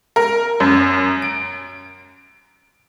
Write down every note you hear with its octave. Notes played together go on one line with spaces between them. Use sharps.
A#4
F#2
D7